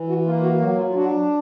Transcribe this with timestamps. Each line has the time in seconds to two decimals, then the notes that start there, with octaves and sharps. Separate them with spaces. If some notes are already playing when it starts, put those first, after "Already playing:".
Already playing: E3
0.09 F#4
0.25 A#3 F4
0.43 F#4
0.60 F#3 F#4
0.77 F4
0.90 F4
0.95 D4 F#4